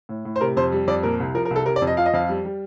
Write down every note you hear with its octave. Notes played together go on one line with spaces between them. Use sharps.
A2
A2
C5
C3 A#4
F2 C5
G3
F2 D5
A#2 A#4
C2
F3 A#4
A#4
C2
A4
C3 A#4
D5
F2
D#5
F3 F5
D#5
F2 F5
G3
G3